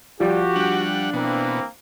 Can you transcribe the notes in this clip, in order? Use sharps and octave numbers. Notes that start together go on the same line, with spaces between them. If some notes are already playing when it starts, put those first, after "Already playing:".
F3 G3 F#4 G4
G3 D4 F#5
B2 E3 A#3 C4